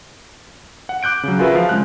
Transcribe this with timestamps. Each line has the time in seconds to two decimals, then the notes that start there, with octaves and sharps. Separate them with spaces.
0.89 F#5
1.03 D6 F#6 G6 D7
1.23 C#3 F#3
1.39 F4 F#4 G#4 A#4 B4 E5
1.55 F3 F5
1.69 C#3 G#3 F#6